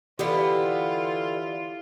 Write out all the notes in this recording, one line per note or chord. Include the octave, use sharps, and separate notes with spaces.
D3 E3 G3 B3 F4 G4